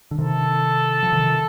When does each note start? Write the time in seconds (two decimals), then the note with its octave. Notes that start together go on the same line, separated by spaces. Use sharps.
0.11 D3
0.18 C3 D#3 A4
1.03 F3
1.12 C3 D#3